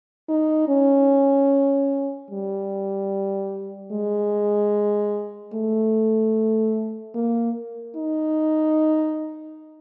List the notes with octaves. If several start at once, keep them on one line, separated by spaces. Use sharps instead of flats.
D#4
C#4
G3
G#3
A3
A#3
D#4